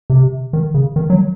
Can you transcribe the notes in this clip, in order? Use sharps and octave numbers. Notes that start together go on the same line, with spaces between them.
C3
D#3
C#3
D#3
F#3